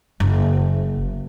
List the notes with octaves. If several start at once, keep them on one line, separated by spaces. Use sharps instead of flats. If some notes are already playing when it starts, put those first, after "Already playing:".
F#1